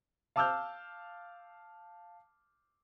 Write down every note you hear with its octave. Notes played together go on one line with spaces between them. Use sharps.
F5 A5 D6 E6 F6 G6